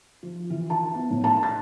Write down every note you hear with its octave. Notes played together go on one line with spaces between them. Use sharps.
F3
E3
A5
B3
A2
A5
A6